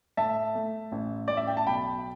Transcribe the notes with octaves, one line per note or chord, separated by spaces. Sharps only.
A2 E5 A5
A3
A1
A1 D5
E5
G5
A5
B1 G5 B5